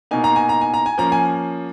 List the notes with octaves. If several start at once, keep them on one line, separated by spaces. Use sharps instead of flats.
B2 A#3 D#4 G#5
A#5
G#5
A#5
G#5
A#5
G#5
F3 A#3 C#4 A#5
G#5